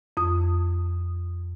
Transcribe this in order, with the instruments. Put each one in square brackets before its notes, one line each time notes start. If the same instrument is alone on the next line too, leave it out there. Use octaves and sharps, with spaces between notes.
[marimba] F2 D#6